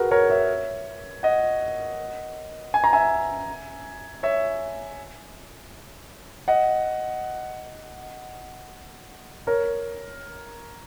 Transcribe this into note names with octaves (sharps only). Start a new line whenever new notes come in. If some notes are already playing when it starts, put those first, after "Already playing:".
Already playing: F#4 G#4 A#4 B4
A#4 C#5
C#5 E5
D#5 F#5
G#5
A#5
E5 G#5
C#5 E5
D#5 F#5
A#4 C#5